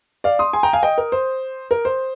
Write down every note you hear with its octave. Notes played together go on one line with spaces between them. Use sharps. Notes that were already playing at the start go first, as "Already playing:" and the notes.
D5 F5
C6 D#6
G#5 C6
G5 A#5
F5 G#5
D#5 G5
A#4
C5
A#4
C5